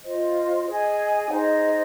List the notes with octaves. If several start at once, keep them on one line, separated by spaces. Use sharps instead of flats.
F4 C5 D#5
G#4 D#5 G#5
D#4 G#4 C5 D#5